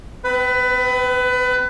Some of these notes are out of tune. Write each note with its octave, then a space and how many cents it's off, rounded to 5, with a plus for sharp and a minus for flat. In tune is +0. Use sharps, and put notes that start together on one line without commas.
C4 -35 B4 +20